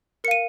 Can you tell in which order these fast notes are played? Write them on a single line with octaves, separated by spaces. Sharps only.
A#4 C#7 F5 D#7